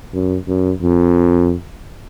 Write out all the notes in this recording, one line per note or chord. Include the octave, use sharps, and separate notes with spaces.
F#2
F#2
F2